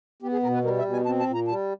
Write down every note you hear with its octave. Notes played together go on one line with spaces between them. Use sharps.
B3 G4
G#4
B2 A#4
B4
G3 A#4
E5
B2
G#5
C4 A5
A5
A#2
A#5
G3 A5